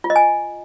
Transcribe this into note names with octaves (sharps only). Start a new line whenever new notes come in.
F4
D#5
G#5